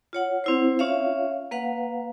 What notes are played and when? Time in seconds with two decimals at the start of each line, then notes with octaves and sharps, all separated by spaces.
0.13 F4 C#5 F#5
0.44 C4 E4 C5
0.79 C#4 F4 C#5 E5 F5
1.51 A#3 B4 F5 F#5